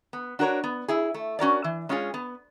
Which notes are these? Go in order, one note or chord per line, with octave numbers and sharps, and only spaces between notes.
B3
D4 F#4 A#4 C#5
B3
E4 G#4
A3
C#4 F#4 A#4 D5
E3
G#3 C#4 F4 G#4
B3